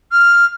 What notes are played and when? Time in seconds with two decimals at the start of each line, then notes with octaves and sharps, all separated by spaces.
0.12 F6